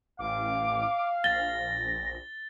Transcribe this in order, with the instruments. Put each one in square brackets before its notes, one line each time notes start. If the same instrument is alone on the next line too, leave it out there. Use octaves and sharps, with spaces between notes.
[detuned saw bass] A1 [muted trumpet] F5 [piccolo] D6
[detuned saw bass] A#1 [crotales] A6 G7 [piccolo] A#6